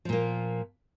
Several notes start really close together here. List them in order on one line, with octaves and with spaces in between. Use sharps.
F3 A#2 A#3